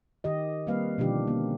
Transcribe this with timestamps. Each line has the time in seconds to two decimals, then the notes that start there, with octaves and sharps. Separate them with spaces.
0.24 D#3 G4 D#5
0.67 G3 A#3 C4 B4 F5
0.98 B2 D3 D#3 F3 D4 G4
1.27 A#3 C#4